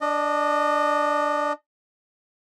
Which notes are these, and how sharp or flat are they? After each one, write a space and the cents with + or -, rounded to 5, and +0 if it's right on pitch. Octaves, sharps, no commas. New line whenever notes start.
D4 +0 D#5 -25